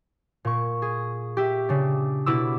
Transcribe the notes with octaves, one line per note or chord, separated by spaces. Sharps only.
A#2 C#6
G#4
G4 E5
C#3 D4
B2 E4 D6 E6